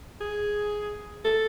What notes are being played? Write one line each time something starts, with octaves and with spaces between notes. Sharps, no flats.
G#4
A4